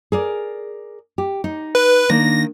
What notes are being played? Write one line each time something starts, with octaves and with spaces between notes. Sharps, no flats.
G#4 A#4 D5
G4
D#4
B4
D#3 A#3 D4 A#6